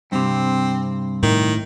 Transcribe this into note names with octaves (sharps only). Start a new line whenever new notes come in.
G2 C3 C4
A2 D#3